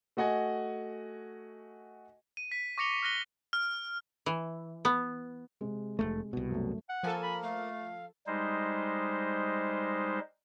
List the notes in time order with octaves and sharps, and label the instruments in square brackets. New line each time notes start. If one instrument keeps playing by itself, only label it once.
[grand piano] A3 F#4 D#5 F#5 G#5
[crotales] D#7
B6
C#6 D6 A#6 C#7 F7 G7
F6 F#6 A#6 G7
F6
[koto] E3
B3
[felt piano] C3 G#3
[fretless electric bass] F1 E2 A3
C2 B2
[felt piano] F#2 A3
[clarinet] F#5
[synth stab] F3 A4 [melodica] A#3 A#4 [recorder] G#5
[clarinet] B5
[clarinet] A3 [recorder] F5
[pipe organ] G3 G#3 D#4 C5